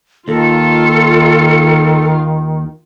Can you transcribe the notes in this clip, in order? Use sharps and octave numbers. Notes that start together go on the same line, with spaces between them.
D#2 D#3 F4 A4